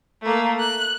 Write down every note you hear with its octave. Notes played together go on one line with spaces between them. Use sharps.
A3 A#3
F#6